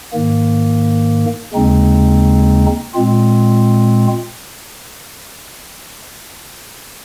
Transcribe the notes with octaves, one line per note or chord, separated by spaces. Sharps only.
G#2 D#3 A#3
D#2 C#3 G#3 C4 D#4
A#2 G#3 C4 F4